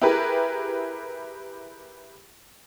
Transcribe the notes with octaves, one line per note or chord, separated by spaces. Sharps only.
E4 G4 G#4 A#4 B4